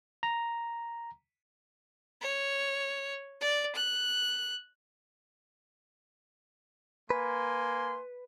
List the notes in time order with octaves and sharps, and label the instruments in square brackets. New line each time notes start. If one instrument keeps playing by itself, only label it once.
[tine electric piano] A#5
[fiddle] C#5
D5
F#6
[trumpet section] A#3 G#5 C6 [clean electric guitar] B4